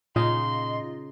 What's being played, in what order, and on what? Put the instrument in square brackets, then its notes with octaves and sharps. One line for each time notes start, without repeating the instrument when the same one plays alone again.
[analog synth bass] A#2 [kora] C#3 D#4 [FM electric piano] F4 D#5 [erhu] C6